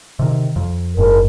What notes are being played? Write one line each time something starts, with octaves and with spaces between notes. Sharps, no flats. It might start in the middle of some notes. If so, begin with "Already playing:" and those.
C3 D#3
F2
F#1 G#2 A#4